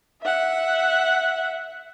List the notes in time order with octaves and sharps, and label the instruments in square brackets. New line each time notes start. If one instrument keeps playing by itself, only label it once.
[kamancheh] E5 F#5